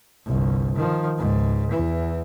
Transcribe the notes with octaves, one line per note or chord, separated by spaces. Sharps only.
G1 C2
D#3 F3
C#2 G#2
E2 E3